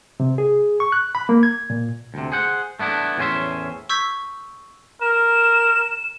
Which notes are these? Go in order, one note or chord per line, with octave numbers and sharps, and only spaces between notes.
C3
G#4
C#6
F#6
B5
A#3
G#6
A#2
D2 C3
G#4 C5 F#5
A3 B3 D4 E4
E2 A2 C#4 D#4 C5 E5
C#6 E6 G6 G#6 B6
A#4 E7